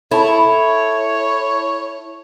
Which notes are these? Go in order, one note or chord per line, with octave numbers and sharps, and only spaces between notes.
E4 A4 C#5 A5 B5